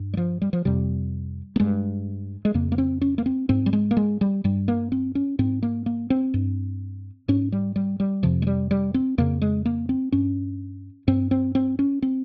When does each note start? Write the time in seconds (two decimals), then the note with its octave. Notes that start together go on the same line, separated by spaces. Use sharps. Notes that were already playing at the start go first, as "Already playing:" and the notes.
Already playing: G2
0.14 G3
0.17 F3
0.42 G3
0.53 F3
0.65 F2 C3 G3
1.56 A#3
1.60 G2 G#3
2.45 G#3
2.54 F2 C#3 A#3
2.72 A#3
2.78 C4
3.01 C#4
3.18 A#3
3.26 C4
3.49 G#2 C4
3.66 G3
3.73 G#3
3.91 A#3
3.97 G#3
4.21 G3
4.44 G2 G3
4.68 A#3
4.92 C4
5.15 C#4
5.39 G#2 C4
5.63 A#3
5.86 A#3
6.10 C4
6.34 G2
7.28 G#2 C#4
7.52 G3
7.76 G3
8.00 G3
8.23 F2 C3 F3
8.42 G#3
8.47 G3
8.71 G3
8.94 C4
9.18 F2 C#3 A#3
9.42 G#3
9.65 A#3
9.89 C4
10.12 G2 C#4
11.07 G2 C4
11.31 C4
11.55 C4
11.79 C#4
12.02 C4